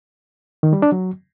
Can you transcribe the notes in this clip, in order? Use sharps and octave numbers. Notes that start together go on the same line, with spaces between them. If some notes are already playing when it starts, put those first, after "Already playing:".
D#3
G3
D4
F#3